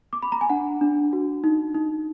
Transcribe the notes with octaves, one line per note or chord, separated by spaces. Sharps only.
D6
B5
A#5
G#5
D4 F#5
D4
F#4
D#4
D#4